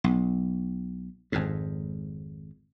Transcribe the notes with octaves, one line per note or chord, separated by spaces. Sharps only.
B1
G#1 F2 G#2